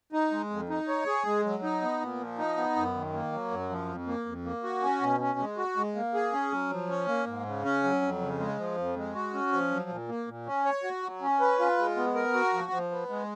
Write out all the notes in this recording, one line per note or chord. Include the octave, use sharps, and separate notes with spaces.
D#4
G#3
F2
D#4
C#5
G#4
G#3
F#3
D#4
B3
A#2
F3
D#4
B3
F#2
D#3
A#3
F#3
F#2
F3
F2
A#3
F2
A#3
F#4
C#4
B2
C#4
G#3
F#4
G#3
A#3
G#4
C#4
F#3
F3
C#4
A#3
G#2
C#3
C#4
F#3
F2
C#3
G#3
F3
F2
G#3
F#4
C#4
F3
F#3
A#2
A#3
A#2
C#4
C#5
F#4
F#3
C#4
B4
F4
G#3
B3
A#4
F#4
F3
F3
B3
G#3